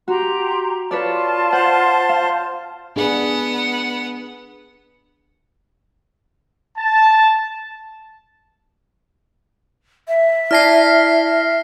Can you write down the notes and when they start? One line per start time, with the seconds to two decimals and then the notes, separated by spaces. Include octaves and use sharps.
0.08 F#4 G4 A#5 C6
0.91 F4 B4 C#5 D5 A5 C6
1.53 C5 F#5
2.09 F5
2.96 B3 D4 G#4 F#5
6.78 A5
10.08 E5
10.51 E4 D5 A5 F6 A#6 C7